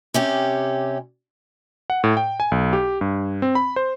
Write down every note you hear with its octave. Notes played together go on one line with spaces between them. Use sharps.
C3 C#4 G4
F#5
A2
G5
G#5
B1
G4
G2
C4
B5
C5